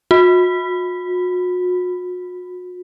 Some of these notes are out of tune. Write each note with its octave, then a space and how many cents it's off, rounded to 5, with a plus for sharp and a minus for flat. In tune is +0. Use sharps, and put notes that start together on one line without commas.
F#4 -40